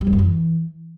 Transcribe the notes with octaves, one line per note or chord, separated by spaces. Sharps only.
G3
F2
F#2
E3